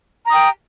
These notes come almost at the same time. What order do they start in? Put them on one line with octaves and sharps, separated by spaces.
A#5 D#6 G5